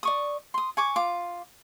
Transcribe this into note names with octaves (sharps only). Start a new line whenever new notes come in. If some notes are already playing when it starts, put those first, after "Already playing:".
D5 C#6 D#6
C6 D#6
G#5 C#6 D6
F4 D6